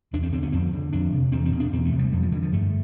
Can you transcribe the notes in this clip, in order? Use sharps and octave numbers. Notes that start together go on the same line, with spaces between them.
E2 D4
C4
D3 C4
B3
F2 C4
D3
F2 D4
C3
E2 C4
C4
B2
D4
E2 C4
A3
C3
G3
F2 G3
F3
D3 E3
F3
G2 A3